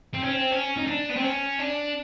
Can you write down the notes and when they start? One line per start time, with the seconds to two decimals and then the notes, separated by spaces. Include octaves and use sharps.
0.14 C4
0.23 C#4
0.33 C4
0.51 C#4
0.77 D#4
0.87 D4
1.09 B3
1.16 C4
1.23 C#4
1.60 D4